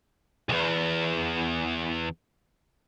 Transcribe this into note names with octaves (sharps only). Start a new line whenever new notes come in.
B1 E2